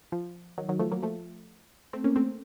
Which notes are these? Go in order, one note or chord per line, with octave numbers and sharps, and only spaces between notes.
F3
D#3 F#3
D#3 F#3
F3 A3
F#3 A#3
F3 A3
A3 C4
A#3 C#4
A3 C4